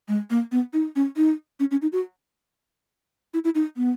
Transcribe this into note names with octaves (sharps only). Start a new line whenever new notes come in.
G#3
A#3
B3
D#4
C#4
D#4
C#4
C#4
D#4
F#4
E4
E4
D#4
B3